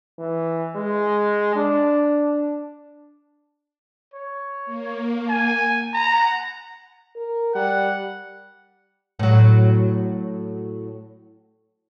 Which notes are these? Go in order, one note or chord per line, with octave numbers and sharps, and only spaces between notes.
E3
G#3
D4
C#5
A#3
G#5
F#5 A#5
A#4
G3 F#5
A2 F#3